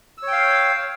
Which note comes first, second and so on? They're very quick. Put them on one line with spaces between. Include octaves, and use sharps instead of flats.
E6 C#5 G5 F5